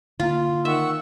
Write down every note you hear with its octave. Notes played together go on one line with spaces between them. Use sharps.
D3 A#3 F4
D#3 E5 F#5 C#6 E6